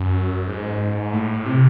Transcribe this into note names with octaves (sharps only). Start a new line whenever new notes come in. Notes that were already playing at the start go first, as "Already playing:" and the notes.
Already playing: F#2
G#2
A2
C3